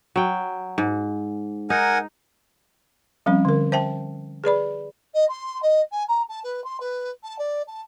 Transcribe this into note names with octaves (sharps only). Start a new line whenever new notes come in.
F#3 G5
G#2
D#4 A#4 F#5 G#5
F3 G3 C4 C#4
D3 A#4
C5 E5 G5 A5
G#4 B4 D5 B5
D#5
C6
D#5
G#5
A#5
A5
B4
C6
B4
A5
D5
A5